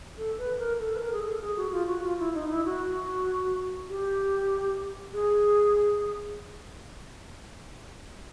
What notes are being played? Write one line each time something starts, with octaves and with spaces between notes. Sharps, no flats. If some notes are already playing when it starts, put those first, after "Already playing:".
A4
B4
A#4
A4
B4
A#4
G#4
A4
G#4
F#4
F4
F#4
F4
E4
D#4
E4
F#4
G4
G#4